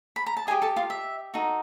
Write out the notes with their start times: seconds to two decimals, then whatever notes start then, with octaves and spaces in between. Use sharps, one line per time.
0.16 B5
0.26 A#5
0.37 A5
0.47 G4 G#4 C5 D#5 G#5
0.62 A4 A5
0.76 F4 F5
0.90 E5
1.34 D#4 F#4 A4